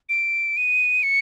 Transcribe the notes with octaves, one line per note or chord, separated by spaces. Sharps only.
D7
D#7
C#7